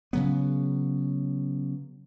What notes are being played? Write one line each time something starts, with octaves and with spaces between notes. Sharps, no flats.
C#3 F#3 B3